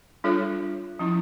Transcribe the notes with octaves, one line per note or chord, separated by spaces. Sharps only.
G3 D4 F4 A4 C#5
F3 C#4 E4